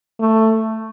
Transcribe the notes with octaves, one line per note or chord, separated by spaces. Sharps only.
A3